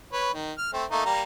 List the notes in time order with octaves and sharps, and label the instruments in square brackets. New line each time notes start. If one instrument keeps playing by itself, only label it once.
[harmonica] B4 C#5
D#3
F6
A3 C4
A3 A#3 D#4
G3 A#3 A#5